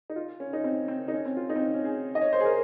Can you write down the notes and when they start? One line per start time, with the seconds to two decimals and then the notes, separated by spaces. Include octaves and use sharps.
0.10 D#4
0.16 F4
0.40 C#4
0.53 D#4
0.64 C4
0.88 C4
1.08 D#4
1.13 C#4
1.25 C4
1.37 F4
1.50 D#4
1.56 C4
1.61 C#4
1.74 C#4
1.85 G#4
2.15 D#5
2.21 C#5
2.33 C5
2.40 G#4
2.45 A#4